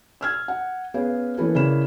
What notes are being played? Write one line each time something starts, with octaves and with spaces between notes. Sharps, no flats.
E6 F6 G#6
F#5
B3 C#4 G#4 B4 F5
E3 A#3 C#4 E4 A4 B4
C#3 E4 A#4 D5 B5 E7